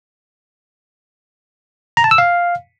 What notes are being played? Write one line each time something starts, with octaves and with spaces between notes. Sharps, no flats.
A#5
A5
E6
F5